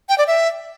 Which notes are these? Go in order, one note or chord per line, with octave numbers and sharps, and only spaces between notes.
G5
D5
E5